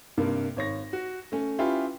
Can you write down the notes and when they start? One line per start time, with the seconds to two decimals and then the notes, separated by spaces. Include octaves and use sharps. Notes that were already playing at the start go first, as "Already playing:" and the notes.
0.18 G2 C3 A#3
0.56 G#1 C#5 A#6
0.93 F#4
1.32 A3 C#4
1.59 C#4 E4 F4 G4 B4